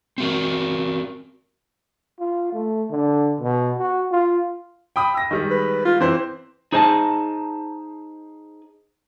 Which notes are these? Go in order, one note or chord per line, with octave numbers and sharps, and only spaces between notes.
C4 F#4 A#4
F4
A3
D3
B2
F#4
F4
G5 B5 D#6
E6 A#6
D#3 G3 G#3
B4
F4
E3 C4 C5
D#4 G#4 C5 D#5 G#5 A5